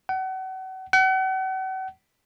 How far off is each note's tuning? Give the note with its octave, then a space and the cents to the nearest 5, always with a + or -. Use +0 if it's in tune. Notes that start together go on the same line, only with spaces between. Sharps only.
F#5 +35
F#5 +40